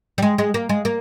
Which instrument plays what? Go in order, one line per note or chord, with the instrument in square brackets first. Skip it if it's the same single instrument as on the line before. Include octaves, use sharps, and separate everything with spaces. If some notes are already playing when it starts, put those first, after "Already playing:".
[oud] G3
G#3
G#3
A#3
G#3
A#3